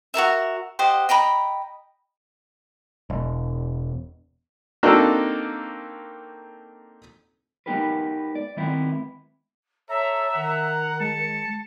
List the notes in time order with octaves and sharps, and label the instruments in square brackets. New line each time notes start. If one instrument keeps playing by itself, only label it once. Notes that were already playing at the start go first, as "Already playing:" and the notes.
[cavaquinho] F#4 A4 A#4 E5
G4 C5 D#5 F#5
D#5 G5 A#5 B5
[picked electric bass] E1
[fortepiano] A#3 C4 D4 D#4 F#4 A4
[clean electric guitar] G#3 B3 D#4 G4 A#4 B4
D5
D#3 G#3 B3 C4 E4
[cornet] A4 [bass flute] C#5 [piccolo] E5 [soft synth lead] A#5
[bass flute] D#3 [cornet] F#5
[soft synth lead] G#3 [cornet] A5 [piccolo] C#7